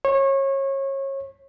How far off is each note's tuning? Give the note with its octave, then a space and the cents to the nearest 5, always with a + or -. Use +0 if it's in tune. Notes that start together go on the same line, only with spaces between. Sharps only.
C#5 -25